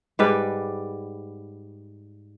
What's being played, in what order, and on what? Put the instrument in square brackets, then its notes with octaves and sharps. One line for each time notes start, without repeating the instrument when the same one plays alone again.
[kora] G#2 G3 B4 D5